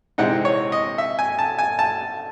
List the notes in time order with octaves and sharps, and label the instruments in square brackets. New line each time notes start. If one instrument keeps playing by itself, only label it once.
[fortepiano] C3 E3 G#3 C4 D#4 F#5
C#5
D#5
E5
G#5
A5
G#5
A5